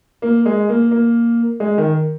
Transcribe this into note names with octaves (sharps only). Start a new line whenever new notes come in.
A#3
G#3
A#3
A#3
G#3
D#3